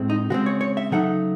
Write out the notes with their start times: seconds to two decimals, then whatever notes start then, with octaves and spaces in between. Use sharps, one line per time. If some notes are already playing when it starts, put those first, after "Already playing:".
Already playing: A2 G#3 C4
0.10 D#4
0.30 C#3 G#3 C4 F#4
0.46 C#5
0.61 C#5
0.77 E5
0.91 C#3 F#3 A3 D#4 F#5